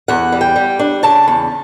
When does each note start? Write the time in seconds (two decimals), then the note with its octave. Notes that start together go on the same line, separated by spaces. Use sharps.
0.08 E2 F#5
0.32 G3
0.41 G5
0.56 G3
0.79 D4
1.03 C#3 A5
1.28 E2